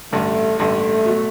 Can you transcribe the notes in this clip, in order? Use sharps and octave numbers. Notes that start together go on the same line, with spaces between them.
A1 G2 D3 A3
A1 G2 D3 A3
B2 F#3